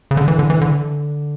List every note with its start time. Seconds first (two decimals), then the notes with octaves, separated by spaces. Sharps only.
0.11 C#3
0.17 D3
0.28 E3
0.39 D3
0.50 E3
0.61 D3